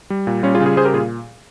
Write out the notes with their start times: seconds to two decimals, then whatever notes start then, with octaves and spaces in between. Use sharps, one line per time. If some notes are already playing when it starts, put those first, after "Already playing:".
0.10 G3
0.27 A#2
0.43 G3 C#4 F4
0.55 F4 G#4
0.60 C#3
0.66 F4 G#4
0.77 G3 G#4 C5
0.85 G4 A#4
0.94 A#2 F4 G#4